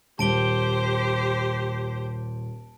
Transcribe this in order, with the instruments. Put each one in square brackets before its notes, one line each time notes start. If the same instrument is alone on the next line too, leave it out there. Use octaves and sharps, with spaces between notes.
[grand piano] D#1 [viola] G4 C5 [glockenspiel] A5 D7 G7